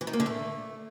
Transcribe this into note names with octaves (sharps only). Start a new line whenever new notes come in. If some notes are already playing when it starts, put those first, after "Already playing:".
E3
D#3
A#3
D3
A3